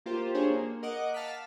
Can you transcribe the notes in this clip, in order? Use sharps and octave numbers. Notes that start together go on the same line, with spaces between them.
A#3 F4 G4 C5
D4 G#4 C5 C#5
A#3
A#4 D#5 F#5 D6
F5 A5 F6 B6